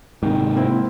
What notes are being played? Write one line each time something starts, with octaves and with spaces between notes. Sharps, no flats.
G#2 C3 D#3
A#3 C4 E4